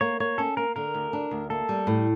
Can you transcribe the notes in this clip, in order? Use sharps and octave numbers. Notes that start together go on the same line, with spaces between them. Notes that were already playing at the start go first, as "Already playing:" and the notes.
A#3 C#5
A#3 C#5
C#4 A4
A#3 A#4
D3 A#4
D2
D4
D2
A#3 A4
G3
A2